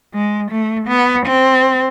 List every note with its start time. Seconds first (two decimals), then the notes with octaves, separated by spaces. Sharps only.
0.14 G#3
0.51 A3
0.89 B3
1.26 C4